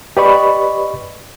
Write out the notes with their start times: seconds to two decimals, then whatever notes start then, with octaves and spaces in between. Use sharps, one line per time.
0.17 G4 B4 D5 D#5 B5 C#6